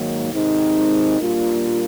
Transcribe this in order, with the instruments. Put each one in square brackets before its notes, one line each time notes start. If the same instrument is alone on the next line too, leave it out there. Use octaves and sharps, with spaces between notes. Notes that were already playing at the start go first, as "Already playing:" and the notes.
Already playing: [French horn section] G#2 D#3 F#3 A#3
C3 D#3 G#3 C4 D#4
A#2 G3 A#3 D4 F4